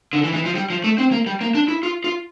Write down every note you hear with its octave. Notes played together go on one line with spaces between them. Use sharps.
D3
E3
E3
F3
G3
F3
A3
C4
A#3
G3
A#3
D4
E4
F4
F4